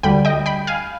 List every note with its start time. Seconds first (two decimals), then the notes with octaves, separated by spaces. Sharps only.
0.03 D2 D3 G3 G5 B5
0.25 D#5 G5
0.46 G5 B5
0.67 F5 G#5